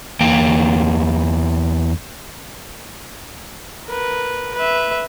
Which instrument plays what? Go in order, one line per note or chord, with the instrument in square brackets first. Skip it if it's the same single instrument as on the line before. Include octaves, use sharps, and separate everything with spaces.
[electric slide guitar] E2 A#3 G5
[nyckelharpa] A#4 B4
B4 E5